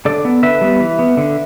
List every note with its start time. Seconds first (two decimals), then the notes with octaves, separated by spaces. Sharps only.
0.05 D3 A4 D5
0.25 B3
0.43 D3 B4 E5
0.61 G3 B3
0.81 E3
0.99 B3
1.17 D3